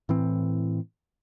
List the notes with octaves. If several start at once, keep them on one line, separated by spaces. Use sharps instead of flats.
A2 E3 C4